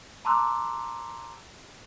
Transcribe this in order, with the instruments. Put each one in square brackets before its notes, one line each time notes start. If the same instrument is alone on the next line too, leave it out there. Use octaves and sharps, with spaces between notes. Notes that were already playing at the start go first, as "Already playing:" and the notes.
[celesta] A5 A#5 C6 D6 E6 F#6